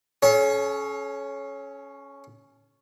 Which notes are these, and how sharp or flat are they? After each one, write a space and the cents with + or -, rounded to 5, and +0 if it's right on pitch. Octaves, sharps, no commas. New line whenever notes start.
C#4 +0 A4 -45 C#5 +0